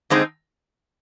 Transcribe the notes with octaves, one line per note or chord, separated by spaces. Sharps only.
D3 G#3 C4 D#4